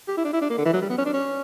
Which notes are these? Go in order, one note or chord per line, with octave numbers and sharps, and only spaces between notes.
G4
E4
D4
E4
D4
A#3
D3
E3
F#3
G3
B3
C#4
D4
C#4